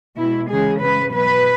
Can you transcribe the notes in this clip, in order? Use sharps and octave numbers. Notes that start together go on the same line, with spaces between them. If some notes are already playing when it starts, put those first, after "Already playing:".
B2 G#3 E4
C#3 E3 G#3 G#4
C#3 G#3 B4
B2 F#3 B4